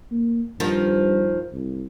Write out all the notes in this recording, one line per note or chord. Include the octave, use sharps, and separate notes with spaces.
A#3
G2 D#3 F3
C2